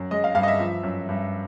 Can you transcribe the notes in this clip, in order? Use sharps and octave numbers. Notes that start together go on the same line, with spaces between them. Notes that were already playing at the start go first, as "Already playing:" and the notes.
Already playing: F#2
G#3 D#5
F5
G2 F5
D#5
E5
F3
F#2
G2